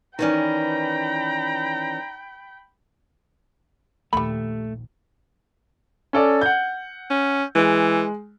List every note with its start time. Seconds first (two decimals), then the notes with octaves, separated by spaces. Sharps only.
0.19 D#3 E3 C#4 D#4 D5 G5 A#5 B5
4.13 A#1 D#2 G3 A3 B5
6.13 C#4 A4 D5
6.41 F#5 G6
7.10 C#4
7.55 E3 G#3